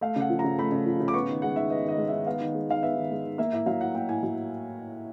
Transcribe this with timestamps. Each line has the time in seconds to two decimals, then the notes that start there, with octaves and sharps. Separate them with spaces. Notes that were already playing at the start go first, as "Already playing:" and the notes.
0.01 A3 F5
0.16 C#3 F#5
0.30 F3
0.39 C#3 A#5
0.59 A3 B5
0.72 C#3
0.86 F3
1.00 C#3
1.08 D6
1.14 B3 C#6
1.29 D#3
1.42 G#3 F#5
1.56 D#3 E5
1.70 B3 D#5
1.85 D#3 D#5
1.98 G#3
2.08 D#3 E5
2.26 B3 F5
2.40 D#3
2.55 G#3
2.69 D#3 F5
2.83 B3 E5
2.96 D#3
3.11 G#3
3.24 D#3
3.38 A#3 E5
3.53 A2 E5
3.66 F#3 F5
3.81 A2 F#5
3.95 A#3 G5
4.09 A2 G#5
4.23 F#3